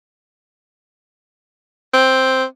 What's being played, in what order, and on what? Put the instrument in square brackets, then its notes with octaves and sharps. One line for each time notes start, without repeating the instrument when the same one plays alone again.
[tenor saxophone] C4